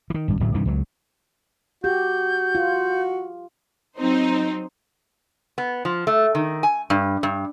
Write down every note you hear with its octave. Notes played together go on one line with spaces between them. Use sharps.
D#3 E3
G#1 G2
D1 A1 F#3
G2 C3 D#3 E3
C#2 F#3
F#4 G4 G6
F4
F#3 C4 D#4 C5
B3
F3
A3
D#3
G#5
G2
G2